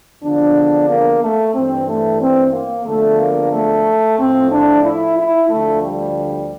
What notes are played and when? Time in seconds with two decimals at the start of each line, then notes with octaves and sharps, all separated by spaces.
0.21 E2 D3 F3 D4
0.87 A#3
1.21 A3
1.54 G2 E3 C4
1.87 A3
2.20 C4
2.53 A#3
2.85 E2 D3 F3 A3
3.18 A#3
3.51 A3
4.17 A2 F3 C4
4.50 D4
4.83 E4
5.17 E4
5.49 D2 D3 F3 A3
5.82 G3